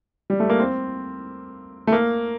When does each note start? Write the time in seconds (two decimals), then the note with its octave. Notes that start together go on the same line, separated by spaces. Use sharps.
0.30 G3
0.40 A3
0.50 A#3
0.59 C4
1.87 A3
1.92 A#3